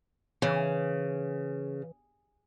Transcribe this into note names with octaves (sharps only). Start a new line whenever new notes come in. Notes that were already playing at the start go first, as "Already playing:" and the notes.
C#3 E3